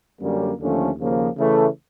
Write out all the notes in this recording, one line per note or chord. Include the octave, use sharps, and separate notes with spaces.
F#2 D3 G3 A#3 C#4
D#2 D3 F3 A3 C#4
D#2 C#3 F3 A#3
C#3 E3 A3